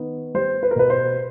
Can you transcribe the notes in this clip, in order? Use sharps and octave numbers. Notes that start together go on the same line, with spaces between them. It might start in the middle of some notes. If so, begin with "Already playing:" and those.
Already playing: D#3 B3
G3 C5
B4
A#4
B2 B4
C5